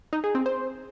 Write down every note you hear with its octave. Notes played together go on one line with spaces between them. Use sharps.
D#4
G#4
C4
C5